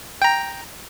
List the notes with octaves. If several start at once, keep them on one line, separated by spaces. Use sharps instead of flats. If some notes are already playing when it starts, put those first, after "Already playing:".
G5 A#5